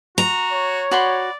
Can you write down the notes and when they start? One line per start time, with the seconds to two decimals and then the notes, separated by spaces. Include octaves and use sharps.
0.18 F#4 A#5
0.52 C#5
0.91 F#4 D5 B5 C6